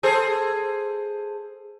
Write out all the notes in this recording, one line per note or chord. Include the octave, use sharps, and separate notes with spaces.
G#4 A4 C5